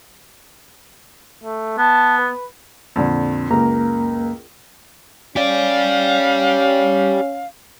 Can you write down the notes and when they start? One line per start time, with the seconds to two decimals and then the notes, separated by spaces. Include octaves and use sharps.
1.44 A3
1.78 B3 A5
2.18 B4
2.96 F2 A#2 D3
3.50 C#2 F#2 A#3 A#4 A#5
5.36 C#4 G4 D5 F5